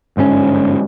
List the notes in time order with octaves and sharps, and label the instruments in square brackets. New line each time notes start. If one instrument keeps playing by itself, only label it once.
[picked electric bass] G1 G#2 D3 C#4